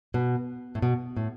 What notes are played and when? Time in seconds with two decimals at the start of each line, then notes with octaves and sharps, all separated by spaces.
0.14 B2
0.75 A2
0.82 B2
1.17 A2